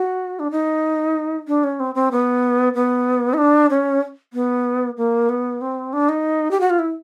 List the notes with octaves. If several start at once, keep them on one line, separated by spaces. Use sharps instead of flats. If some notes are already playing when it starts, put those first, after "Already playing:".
Already playing: F#4
D4
D#4
D4
C#4
C4
C4
B3
B3
D#4
D4
C#4
B3
A#3
B3
C4
D4
D#4
G4
F#4
F4
E4